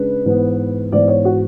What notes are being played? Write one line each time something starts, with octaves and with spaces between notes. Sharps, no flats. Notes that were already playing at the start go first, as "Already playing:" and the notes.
Already playing: C#3 G#3 D4 B4
G#2 E3 B3
G#2 E3 B3 D5
C#5
F#4